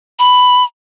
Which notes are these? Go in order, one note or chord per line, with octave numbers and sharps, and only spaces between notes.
B5